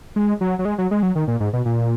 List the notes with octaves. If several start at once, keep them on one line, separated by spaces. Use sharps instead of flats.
G#3
F#3
F#3
G#3
F#3
G#3
F#3
D#3
A#2
G#2
B2
A#2